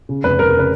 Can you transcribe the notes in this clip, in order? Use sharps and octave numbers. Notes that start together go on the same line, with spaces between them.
C#3
F1 B4
F1 A#4
A#4
C#3 B4